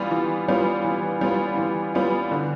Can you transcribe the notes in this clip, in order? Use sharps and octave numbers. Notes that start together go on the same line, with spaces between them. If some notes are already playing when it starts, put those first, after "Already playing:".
Already playing: E3 G3 B3 F4
E3
G3 B3 F4
E3
G3 B3 F4
E3
G3 B3 F4
D3